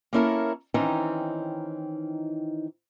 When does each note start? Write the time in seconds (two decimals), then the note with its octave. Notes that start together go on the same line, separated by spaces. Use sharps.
0.13 A#3 B3 C#4 E4 A4 A#4
0.74 D#3 E3 C4 C#4 D#4